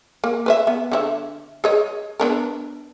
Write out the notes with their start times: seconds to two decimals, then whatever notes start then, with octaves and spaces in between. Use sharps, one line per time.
0.24 A#3
0.46 B4 C5 E5
0.67 B3
0.91 D3 F#4 E5
1.64 G#4 C#5 D#5
2.20 B3 D4 A#4